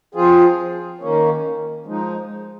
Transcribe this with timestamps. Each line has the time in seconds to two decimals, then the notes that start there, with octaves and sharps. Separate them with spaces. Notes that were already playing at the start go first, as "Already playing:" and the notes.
0.15 F3 C4 F4 G#4
1.00 D#3 A#3 C#4
1.86 F3 G#3 D#4